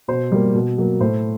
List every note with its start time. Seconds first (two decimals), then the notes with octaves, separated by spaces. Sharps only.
0.08 B2 C5
0.32 G3 A#3
0.55 B2
0.78 F#3 A#3
1.00 A2 C5